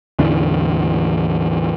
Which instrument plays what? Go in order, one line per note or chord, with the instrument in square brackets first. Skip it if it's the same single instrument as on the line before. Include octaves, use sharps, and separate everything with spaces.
[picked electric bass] A1 E2 D3 E3